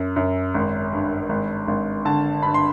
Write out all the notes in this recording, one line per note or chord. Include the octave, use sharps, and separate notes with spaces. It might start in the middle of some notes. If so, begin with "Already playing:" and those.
Already playing: F#2
F#2
G#1
G2
G#1
G#1
D3 A5
G2 B5
C6